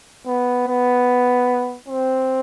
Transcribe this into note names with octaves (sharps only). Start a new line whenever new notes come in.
B3
B3
C4